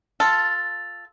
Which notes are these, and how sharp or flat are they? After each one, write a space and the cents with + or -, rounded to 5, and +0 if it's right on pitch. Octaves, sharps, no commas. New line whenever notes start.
F4 +0 A4 +0